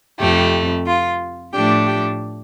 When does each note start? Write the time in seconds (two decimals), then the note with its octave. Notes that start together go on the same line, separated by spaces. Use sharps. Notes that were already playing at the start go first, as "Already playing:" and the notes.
0.19 F2 C3 A3 G4
0.86 F4
1.53 A2 F3 A3 D4 G4
1.86 G4